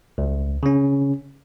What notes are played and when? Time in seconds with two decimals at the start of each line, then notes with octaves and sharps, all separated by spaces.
0.18 C#2
0.63 C#3 C#4